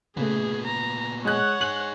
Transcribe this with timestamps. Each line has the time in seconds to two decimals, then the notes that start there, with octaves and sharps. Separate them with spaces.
0.17 A#2 C#3 A3 B3 G#4
0.67 A#5
1.25 G#3 C#5 F#5 F#6
1.61 D#4 G#4 F#7